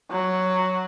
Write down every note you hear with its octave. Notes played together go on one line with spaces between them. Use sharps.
F#3